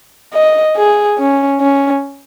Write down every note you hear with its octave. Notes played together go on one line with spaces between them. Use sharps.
D#5
G#4
C#4
C#4